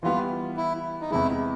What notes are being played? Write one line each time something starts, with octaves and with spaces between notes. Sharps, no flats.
E3 G3 B3 F4
E4
D#4
E2 C3 E3 G#3 E4